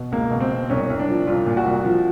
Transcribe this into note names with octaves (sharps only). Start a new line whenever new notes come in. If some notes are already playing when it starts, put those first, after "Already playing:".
Already playing: B2
C#2 A#3
B2
C4
B2
C2 C#4
C2
D4
F3
C2 F4
A#2
F#4
C2
F3